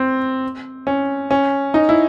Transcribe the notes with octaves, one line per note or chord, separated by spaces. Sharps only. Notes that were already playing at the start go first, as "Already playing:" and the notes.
Already playing: C4
C#4
C#4
D#4
E4